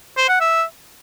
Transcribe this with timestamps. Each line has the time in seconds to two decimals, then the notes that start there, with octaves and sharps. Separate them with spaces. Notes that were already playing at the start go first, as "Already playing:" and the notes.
0.17 C5
0.29 F#5
0.40 E5